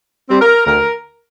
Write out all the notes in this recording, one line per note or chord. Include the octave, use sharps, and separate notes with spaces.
G3 C4
A#4
D2 A#4